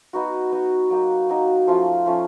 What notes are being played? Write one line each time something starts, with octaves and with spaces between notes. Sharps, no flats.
B3 D#4 F#4
B3 D#4 F#4
F#3 A#3 D#4
F#3 A#3 D#4
F3 A3 C#4 F4
F3 A3 C#4 F4